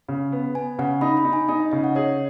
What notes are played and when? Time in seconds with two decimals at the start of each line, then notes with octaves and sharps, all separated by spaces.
0.08 C#3
0.32 B3
0.55 B3 G#5
0.78 C#3 F#5
1.01 D#4 B5
1.17 B5
1.25 D#4
1.33 G#5
1.48 D#4 G#5
1.60 D#5
1.72 C#3 D#5
1.84 F#5
1.95 G#4 C#5